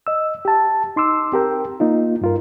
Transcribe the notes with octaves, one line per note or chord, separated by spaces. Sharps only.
D#5 E6
G4 A5
D#4 C6 D6 E6
C4 G4 A#4 G5
A#3 D#4 F4
G2 F4 A#4